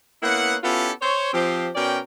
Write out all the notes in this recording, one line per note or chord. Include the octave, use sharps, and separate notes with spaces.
A#3 B3 C#4 E4 F#5
B3 C#4 E4 F4 G4 A4
C5 C#5
F3 C4 G4
B2 C#4 A#4 D5 G5